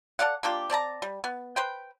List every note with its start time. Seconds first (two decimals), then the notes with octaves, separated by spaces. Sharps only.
0.19 A4 D5 F5 F#5
0.43 A#3 D4 F4 G4
0.70 C4 D5 A5 A#5
1.02 G3
1.24 B3
1.56 B4 C5 G5